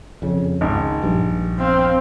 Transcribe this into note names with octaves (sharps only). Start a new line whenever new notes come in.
F2 C#3
G#1 C#2
A#1 G2
C4 F5